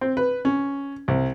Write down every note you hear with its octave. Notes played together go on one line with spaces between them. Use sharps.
C4
B4
C#4
C2